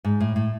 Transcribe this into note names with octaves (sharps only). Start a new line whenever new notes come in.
G#2
A2
A2